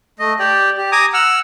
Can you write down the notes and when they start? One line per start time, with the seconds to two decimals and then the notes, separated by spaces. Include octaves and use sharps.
0.19 A3 D#5
0.39 G4 D5 G5
0.78 G4
0.92 G#5 A#5 D6 D#6
1.14 F#5 E6 F6